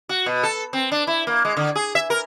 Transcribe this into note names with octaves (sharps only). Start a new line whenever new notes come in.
F#4
B2
A4
C4
D4
E4
A#3
G#3
D3
G#4
E5
A#4